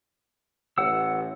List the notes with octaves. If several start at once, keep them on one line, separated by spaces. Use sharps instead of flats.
A1 F#5 E6